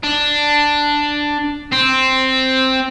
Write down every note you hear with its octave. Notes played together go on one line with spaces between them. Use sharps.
D4
C4